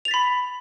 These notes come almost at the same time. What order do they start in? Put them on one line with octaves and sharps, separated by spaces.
F7 A6 B6 B5